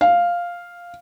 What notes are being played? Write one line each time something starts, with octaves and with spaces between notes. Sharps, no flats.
F5